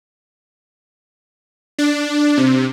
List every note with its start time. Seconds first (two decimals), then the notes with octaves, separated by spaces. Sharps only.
1.79 D4
2.37 C3